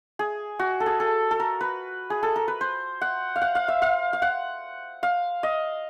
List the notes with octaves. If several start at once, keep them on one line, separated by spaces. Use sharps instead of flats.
G#4
F#4
A4
G#4
A4
A4
A#4
B4
G#4
A4
A#4
B4
C5
F#5
F5
F#5
F5
E5
F5
F5
F#5
F5
D#5